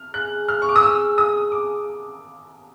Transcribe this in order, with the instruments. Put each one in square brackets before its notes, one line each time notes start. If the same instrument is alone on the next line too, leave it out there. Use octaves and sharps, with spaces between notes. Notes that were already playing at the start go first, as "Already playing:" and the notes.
Already playing: [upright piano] F6
[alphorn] G#4 [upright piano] F#6
[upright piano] F6
C#6
D6
D#6
E6
D#6
D6